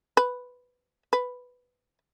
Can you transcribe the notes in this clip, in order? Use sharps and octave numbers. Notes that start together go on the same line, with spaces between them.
B4
B4